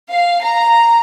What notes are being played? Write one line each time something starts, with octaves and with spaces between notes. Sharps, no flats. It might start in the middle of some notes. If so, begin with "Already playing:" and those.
F5
A#5